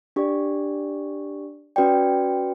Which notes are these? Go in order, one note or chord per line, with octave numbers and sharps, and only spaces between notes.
D4 G4 D5
C#4 F#4 B4 D5 G5